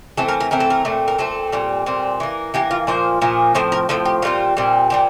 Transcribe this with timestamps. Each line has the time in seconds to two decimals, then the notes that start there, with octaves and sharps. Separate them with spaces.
0.17 E3 A3 C4 A4
0.28 A#4
0.40 A#4
0.51 E3 A3 C4 A#4
0.60 A4
0.70 A#4
0.85 A#2 A3 C4
1.08 A#4
1.18 A#2 A3 C4 A4
1.52 A#2 G3 C4
1.86 A#2 G3 C4
2.20 E3 A#3
2.54 E3 A#3 G4
2.71 F4
2.87 A#2 F3 A#3 C5
3.21 A#2 F3 A#3
3.55 A2 F3 C4 C5
3.72 A#4
3.89 A2 F3 C4 A4
4.05 G4
4.22 A#2 G3 C4 F4
4.57 A#2 G3 C4
4.90 A#2 G3 C4 G4